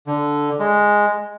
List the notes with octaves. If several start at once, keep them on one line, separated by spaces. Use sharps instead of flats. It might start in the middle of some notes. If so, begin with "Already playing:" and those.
D3
G#3